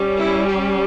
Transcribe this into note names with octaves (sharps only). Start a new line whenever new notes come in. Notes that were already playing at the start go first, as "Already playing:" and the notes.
Already playing: G3 C#4
E4
G4